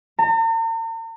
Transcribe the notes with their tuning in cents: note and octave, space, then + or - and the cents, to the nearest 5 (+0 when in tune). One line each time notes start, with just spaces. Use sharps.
A#5 -45